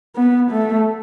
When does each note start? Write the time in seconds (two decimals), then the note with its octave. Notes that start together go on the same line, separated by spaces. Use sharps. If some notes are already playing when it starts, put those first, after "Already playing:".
0.16 B3
0.50 A3